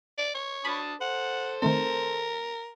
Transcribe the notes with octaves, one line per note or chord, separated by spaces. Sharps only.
D5
C#5
D4 A5 B5 D#6
A4 C5 F#5
D#3 A3 C4 A#4